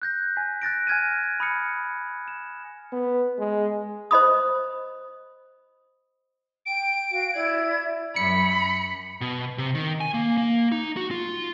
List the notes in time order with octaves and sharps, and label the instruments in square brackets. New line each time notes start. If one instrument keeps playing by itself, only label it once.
[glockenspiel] F#6 G6 A#6
G#5 B6
F#6 A6 A#6 D7
G#5 F6 G#6 A#6 D#7
B5 D#6 F6 C#7
E7
[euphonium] B3
G#3
[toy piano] C5 D#5 B5 D#6
[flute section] G5 [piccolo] D7
[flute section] F#4 F5
E4 D5 G#6
[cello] F#2 [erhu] B5 [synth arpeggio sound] C#7
[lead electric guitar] B2
C3
D#3
G#5
A#3
A#3
D#4
F#4
F4